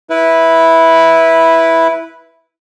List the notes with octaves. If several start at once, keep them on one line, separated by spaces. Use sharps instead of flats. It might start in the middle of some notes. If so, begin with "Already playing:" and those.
E4 B4